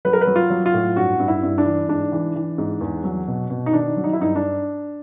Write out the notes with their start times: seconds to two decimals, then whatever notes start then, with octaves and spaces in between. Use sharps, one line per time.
0.05 F#3 B4
0.13 A#4
0.21 B4
0.27 F#3
0.36 F4
0.50 F#3
0.66 F4
0.74 A2
0.96 G2 F#4
1.19 G2
1.28 E4
1.43 G2
1.58 D4
1.65 E3
1.88 G#2 D4
2.12 E3
2.36 E3
2.58 G#2
2.81 E2
3.04 F#3
3.27 B2
3.50 B2
3.66 D#4
3.73 D#3 D4
3.97 F#3
4.04 D#4
4.13 E4
4.20 G2 D#4
4.36 D4